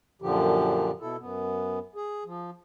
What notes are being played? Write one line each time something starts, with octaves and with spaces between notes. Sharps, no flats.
F#2 A#2 D3 F3 G4
B2 E4 A4
F#2 B3
G#4
F3